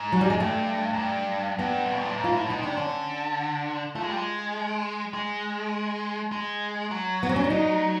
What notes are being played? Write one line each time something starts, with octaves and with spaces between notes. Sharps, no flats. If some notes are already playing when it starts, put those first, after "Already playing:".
Already playing: G#2
F#3
G3
G#3
G2 A3
F#2
G2
G2 B3
C3
B2
A#2
A2
G#2
F4
A2
E4
B2 D#4
C3 D4
D3 C#4
A3 F4
G#3
G3
G#3
G#3
G#3
F#3
B3
C4
C#4
D4
D#4